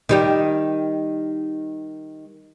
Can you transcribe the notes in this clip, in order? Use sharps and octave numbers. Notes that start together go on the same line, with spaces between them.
D#3 G3 G4